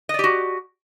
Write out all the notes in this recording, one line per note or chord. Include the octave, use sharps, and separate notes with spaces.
F#4 G4 D5 D#5